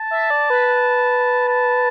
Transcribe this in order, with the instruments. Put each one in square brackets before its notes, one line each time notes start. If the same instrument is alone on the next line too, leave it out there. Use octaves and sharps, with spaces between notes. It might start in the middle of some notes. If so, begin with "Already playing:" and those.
Already playing: [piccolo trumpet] A5
[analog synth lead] E5
D5
B4
[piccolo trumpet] A5